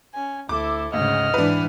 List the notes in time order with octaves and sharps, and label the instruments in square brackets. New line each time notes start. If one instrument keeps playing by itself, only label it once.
[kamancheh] C#4 G#5
[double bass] D2 [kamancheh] E4 A4 [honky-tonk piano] D6
[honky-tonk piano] D2 [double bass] G#2 C#3 [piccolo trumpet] D#5 [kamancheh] F#5 F6
[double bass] G#2 E3 [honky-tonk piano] D4 B4